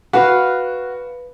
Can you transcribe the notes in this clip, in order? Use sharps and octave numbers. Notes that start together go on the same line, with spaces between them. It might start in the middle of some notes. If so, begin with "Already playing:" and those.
F#4 B4 F5